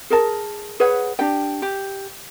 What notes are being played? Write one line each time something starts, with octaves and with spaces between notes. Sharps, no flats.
G#4 A#4 A5
G#4 B4 C#5 F#5
D4 G4 G5
G4